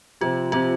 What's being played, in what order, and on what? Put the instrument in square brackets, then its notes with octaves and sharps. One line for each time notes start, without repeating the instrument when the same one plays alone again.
[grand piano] C3 F3 C4 G4 [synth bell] F4
[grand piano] C3 F3 C4 G4 [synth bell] F4